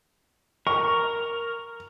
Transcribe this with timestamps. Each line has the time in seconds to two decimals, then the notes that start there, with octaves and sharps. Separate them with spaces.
0.67 A#4 C#6